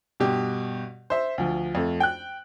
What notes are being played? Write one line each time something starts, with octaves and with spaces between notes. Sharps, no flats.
G2 B2 G4
C5 E5
D2 F3
F2 A3
G5 F#6